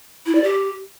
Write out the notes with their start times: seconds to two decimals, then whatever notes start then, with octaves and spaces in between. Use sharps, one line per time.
0.26 E4
0.35 D5
0.44 G4